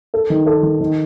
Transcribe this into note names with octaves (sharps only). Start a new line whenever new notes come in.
A4
D#3
A4
D#3
D#3